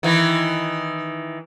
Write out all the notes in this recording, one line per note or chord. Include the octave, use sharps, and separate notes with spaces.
D#3 E3